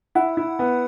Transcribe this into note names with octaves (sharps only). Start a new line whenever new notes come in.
E4 F#5
E4
B3